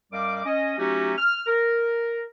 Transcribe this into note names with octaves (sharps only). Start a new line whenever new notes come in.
F#2 G3 D#5 F5 D6
C#4 D#5
F#3 A3 C#4 D#4 F#4 G4
F6
A#4